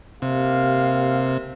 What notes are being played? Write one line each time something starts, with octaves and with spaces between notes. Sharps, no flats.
C3 A#3 G4 F5